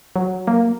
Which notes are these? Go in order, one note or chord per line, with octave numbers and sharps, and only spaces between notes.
F#3
A#3